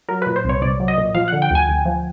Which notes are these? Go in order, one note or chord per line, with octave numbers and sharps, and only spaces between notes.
F#3 A#4
B4
A#2
C5
C2
C#5
C2 D5
F#3
D#5
A#2
F3 F5
F#5
D3
G5
D2 G#5
D2
F3